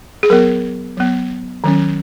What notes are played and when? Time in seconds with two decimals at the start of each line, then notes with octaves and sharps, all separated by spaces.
0.23 G#4
0.30 F#3 B3 A#4
0.97 F#3 B3
1.64 D#3 F#3 C#4